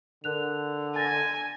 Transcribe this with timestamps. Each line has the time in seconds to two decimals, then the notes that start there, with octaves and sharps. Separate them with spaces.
0.24 D3 A#4 F#6 F7
0.96 G#5 A6 A#6